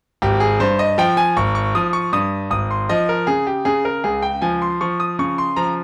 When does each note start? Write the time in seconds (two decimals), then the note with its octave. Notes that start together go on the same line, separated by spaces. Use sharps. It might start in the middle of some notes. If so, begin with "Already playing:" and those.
0.22 G#1 G4
0.40 G#4
0.60 G2 C5
0.79 D#5
0.98 F3 G5
1.17 G#5
1.37 G#1 C#6
1.55 C#6
1.75 F3 D#6
1.93 C#6
2.13 G2 D#6
2.51 G#1 D#6
2.71 C6
2.89 F3 D#5
3.09 A#4
3.27 C#3 G#4
3.47 G4
3.65 C#3 G#4
3.85 A#4
4.04 C#2 G#4
4.22 G5
4.42 F3 G#5
4.62 C6
4.81 F3 C#6
5.00 D#6
5.19 C#3 C#6
5.38 C6
5.56 F3 A#5